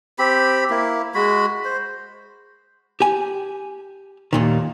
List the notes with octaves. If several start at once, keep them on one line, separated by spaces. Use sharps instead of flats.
C4 G4 B5
A#3 E4
G#3 F#4 B5
C5
G4 G#5
D#2 A#2 D#3